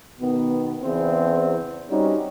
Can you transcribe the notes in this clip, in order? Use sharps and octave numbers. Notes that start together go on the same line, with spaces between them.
B2 D#3 B3
E2 C#3 C4 E4 C5
G3 C4 C#4 D#4 F#4